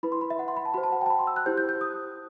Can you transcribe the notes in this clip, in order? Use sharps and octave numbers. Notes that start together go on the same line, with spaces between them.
E4 B4 B5
C6
B5
E5
F#5
C6
B5
A5
F#4 C5 B5
A5
F#5
G5
A5
B5
C6
E6
F#6
E4 G4 C5 G6
G6
G6
D#6